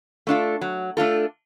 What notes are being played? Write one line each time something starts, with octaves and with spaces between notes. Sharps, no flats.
A3 D4 F4 A4
F#3
A3 D4 F4 A4